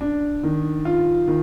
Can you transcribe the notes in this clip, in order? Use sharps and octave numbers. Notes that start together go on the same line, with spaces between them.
D4
D#3
F4
D#3